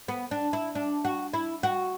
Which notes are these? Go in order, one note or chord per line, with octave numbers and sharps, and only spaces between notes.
B3
D4
E4
D4
F#4
E4
F#4